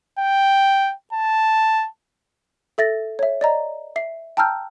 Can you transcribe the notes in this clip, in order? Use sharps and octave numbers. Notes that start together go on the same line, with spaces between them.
G5
A5
A4 E5 A6 A#6
C#5 E5
D5 D#5 A#5
E5 C7
G5 A5 A#5 E6 F6 G6